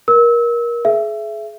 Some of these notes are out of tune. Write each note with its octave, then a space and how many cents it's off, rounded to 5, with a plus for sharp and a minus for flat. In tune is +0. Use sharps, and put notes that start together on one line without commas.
A#4 +25 E6 -25
G#4 +35 E5 +20